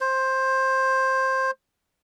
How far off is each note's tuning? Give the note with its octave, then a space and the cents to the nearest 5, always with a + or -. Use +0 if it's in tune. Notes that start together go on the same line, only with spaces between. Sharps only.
C5 +15